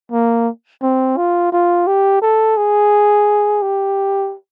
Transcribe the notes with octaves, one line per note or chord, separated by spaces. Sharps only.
A#3
C4
F4
F4
G4
A4
G#4
G4